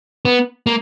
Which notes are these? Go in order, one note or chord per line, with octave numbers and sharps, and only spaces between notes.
B3
A#3